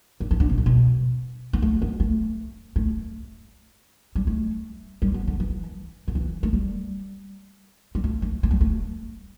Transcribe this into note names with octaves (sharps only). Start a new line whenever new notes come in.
D3
E3
D3
B2
A2
B2
B3
A3
B3
A3
A3
G3
A3
G3
B3
D3
E3
D3
E3
A3
G3
G3
A3
A3
A3
G3
A3